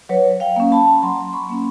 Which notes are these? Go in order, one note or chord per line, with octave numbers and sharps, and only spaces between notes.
F#3 B4 C#5
F5 G5
A#3 C#4
A5 B5
F#3 A#5 C6
B5 C#6
A#3 C#4